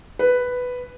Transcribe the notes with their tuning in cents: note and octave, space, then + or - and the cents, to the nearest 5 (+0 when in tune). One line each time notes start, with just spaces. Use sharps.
B4 +5